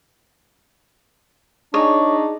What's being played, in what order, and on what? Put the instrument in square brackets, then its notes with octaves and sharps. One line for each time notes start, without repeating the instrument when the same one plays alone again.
[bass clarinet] D4 [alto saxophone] D#4 [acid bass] G#4 [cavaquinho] C#5